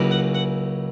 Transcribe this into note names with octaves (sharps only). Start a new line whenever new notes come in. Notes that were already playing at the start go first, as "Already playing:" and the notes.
Already playing: C#2 C#3 F#3 A#3 E4
F#5
F#5